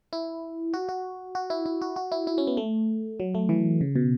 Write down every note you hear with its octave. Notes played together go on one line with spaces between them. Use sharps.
E4
F#4
F#4
F#4
E4
E4
F#4
F#4
E4
E4
C#4
B3
A3
F#3
A3
E3
C#3
B2